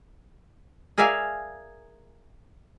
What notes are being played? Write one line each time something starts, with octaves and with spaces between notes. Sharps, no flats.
G#4 A#4 D5 E5 F5 G#5